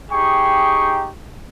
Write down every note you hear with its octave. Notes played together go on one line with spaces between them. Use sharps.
D#4 G4 G#4 G5 C#6